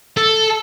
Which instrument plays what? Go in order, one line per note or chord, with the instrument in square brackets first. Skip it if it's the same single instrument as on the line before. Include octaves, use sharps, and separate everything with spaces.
[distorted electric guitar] A4